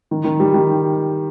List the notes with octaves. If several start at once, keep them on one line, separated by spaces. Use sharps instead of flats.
D#3
D#3
G3
D#3